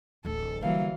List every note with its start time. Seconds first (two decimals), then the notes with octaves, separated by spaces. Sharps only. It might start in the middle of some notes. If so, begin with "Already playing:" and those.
0.25 D1 A1 A4
0.62 D3 E3 F#3 G3 A#3 F5